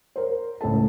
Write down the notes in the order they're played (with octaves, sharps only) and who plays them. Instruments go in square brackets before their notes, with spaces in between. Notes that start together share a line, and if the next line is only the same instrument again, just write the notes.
[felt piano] A#4 C5
C#2 A2 A4 A5